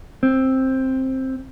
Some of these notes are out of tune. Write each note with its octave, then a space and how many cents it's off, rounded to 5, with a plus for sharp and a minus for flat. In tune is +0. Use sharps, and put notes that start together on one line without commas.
C4 +10